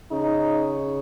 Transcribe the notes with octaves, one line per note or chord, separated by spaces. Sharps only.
C#3 D#4